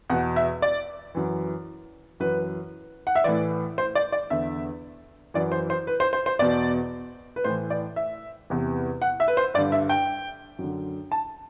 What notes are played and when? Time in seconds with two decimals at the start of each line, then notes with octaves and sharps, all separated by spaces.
0.10 E2 B2 F#5
0.36 E5
0.62 D5
1.15 F#2 E3
2.20 F#2 E3 B4
3.07 F#5
3.15 E5
3.24 A2 E3 D5
3.78 C5
3.95 D5
4.12 D5
4.30 E2 D3 E5
5.34 F#2 E3 D5
5.52 C5
5.70 C5
5.87 B4
6.00 C5
6.13 C5
6.26 C5
6.39 E2 B2 D5
7.36 B4
7.44 A2 E3 C5
7.70 D5
7.96 E5
8.50 E2 C3 E3
9.02 F#5
9.20 E5
9.28 B4
9.37 C5
9.54 G2 D5
9.58 D3
9.72 E5
9.89 G5
10.59 F#2
10.64 D3
11.12 A5